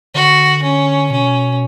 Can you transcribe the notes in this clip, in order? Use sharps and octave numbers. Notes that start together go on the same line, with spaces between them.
D3 F#4
C#4
B2 C#4